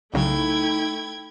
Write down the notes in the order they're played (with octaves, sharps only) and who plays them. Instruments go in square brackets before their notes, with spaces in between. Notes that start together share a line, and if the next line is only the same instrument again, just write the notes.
[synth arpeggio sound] C2 C#3 F#3 [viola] A3 E4 [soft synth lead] D#4 [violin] G5 G#6